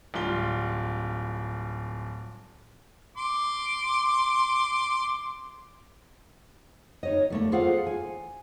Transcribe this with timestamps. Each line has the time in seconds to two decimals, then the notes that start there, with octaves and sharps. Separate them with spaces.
0.14 D1 G3 F4 G7
3.17 C6 D6
7.03 D#4 C#5 D#5
7.30 G3 A3 A#3
7.52 F4 G#4 A4 C5 F5 F#5
7.87 G#5